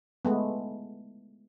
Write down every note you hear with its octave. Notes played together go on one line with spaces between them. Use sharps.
G#3 A3 B3